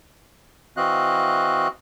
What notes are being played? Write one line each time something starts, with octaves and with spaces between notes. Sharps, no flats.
E3 C4 F#4 D#5 F5 F#6